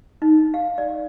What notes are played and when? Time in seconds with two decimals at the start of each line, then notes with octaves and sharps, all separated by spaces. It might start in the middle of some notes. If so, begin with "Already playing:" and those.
0.22 D#4
0.54 F5
0.78 D5